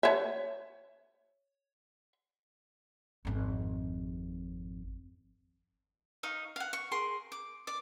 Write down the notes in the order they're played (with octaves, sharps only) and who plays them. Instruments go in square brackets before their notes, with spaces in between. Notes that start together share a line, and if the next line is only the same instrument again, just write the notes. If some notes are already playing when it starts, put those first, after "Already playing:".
[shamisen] C#5 E5
[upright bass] G#1 F2
[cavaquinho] D#4 F5 C#6
F5 F#5
C#6
G#4 A#4 C6 C#6
D6
D5 D6